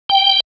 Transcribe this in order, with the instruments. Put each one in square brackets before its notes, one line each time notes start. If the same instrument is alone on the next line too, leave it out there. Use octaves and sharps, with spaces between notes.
[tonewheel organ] G5